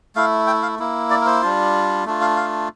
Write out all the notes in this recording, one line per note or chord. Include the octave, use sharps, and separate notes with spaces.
A3 E4 F5
G5
F5
A#3 E4
D5
A#4
C5
G3 D4 F4
A3 D4 F4
F5
F5